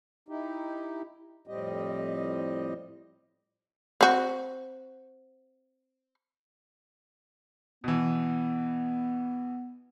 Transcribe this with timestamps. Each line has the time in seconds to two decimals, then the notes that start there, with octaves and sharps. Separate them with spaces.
0.28 D#4 E4 G4
1.47 F2 A2 G3 C4 G4 D#5
4.01 C4 F#4
7.84 B2 E3 B3